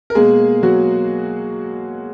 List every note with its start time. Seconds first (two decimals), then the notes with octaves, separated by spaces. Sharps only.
0.10 A#4
0.15 B2 G#3 A#3 G#4
0.63 F#3 F#4